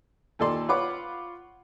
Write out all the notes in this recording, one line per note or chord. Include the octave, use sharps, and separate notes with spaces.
D#2 A#2 A4 D5 C6
F4 B4 C#5 F#5 B5 D6